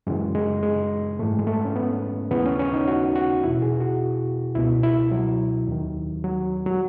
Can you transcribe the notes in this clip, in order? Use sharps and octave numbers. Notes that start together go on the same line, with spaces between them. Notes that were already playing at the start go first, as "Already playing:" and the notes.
F#2 C#3 E3 G#3
G#3
G#3
G#2 E3 A3
G#3
A3
C#4
B3
D#2 C#3 E3 B3
C#4
C#4
D#4
F#4
F#4
E2 B2 E4
G#4
F#4
C#2 B2 E4
E4
F#3
D#2 D#3
F#3
F#3